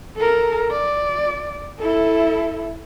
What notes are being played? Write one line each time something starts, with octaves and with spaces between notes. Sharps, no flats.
A4 A#4
D5
E4 A4